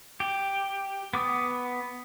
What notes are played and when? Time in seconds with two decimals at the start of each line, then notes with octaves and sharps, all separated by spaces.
0.20 G4
1.14 B3 D6 D#6